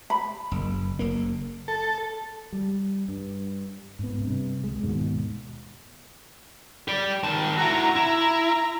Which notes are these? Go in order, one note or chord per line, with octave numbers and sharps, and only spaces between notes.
B5
F#1
F#1 A#3
A4
G3
G2
G#2 B3
G2 C3
C#2 G#3
D#2 G#2 B2
G4 D5
D#3 A5
E4 F#4 A#5
E4